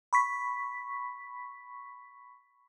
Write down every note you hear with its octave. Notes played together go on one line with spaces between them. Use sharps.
B5 C#6 B6